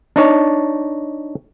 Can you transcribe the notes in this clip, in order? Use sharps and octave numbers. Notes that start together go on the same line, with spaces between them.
D4 D#4 C#5 A5